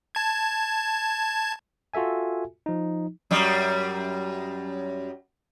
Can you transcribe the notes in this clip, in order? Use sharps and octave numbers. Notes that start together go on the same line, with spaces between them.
A5 G#6
F4 F#4 A4 E5 G#5
F3 D#4
F#2 G3